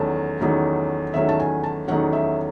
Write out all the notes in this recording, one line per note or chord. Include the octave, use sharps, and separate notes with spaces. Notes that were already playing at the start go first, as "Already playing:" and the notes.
Already playing: E2 D#3 F#3 A3 C#4 A5
E2 D#3 F#3 A3 C#4
E2 D#3 F#3 A3 C#4 E5
A5
G#5
A5
E2 D#3 F#3 A3 C#4 F#5
E5